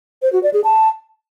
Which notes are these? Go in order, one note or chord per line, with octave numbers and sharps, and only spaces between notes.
C5
F#4
D5
G#4
A5